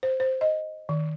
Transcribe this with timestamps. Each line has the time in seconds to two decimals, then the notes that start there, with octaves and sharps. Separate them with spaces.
0.03 C5
0.20 C5
0.41 D#5
0.89 D#3